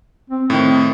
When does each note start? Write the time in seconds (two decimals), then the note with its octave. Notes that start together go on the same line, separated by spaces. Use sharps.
0.30 C4
0.50 A2 D#3 C4